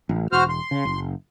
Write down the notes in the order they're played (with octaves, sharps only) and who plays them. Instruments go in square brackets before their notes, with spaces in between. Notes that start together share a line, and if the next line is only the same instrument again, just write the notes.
[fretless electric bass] A1
[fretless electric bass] E1 [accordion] F#4 C5 F6
[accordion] C6
[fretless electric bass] C#3
F#1